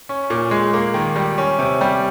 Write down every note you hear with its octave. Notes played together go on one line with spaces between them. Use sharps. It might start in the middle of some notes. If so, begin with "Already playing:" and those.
C#4
A#2
G#3
A#3
D#3
G3
C#4
C3
G3